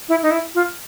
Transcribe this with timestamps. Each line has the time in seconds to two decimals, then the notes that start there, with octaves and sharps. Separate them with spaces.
0.09 E4
0.23 D#4
0.31 E4
0.55 F4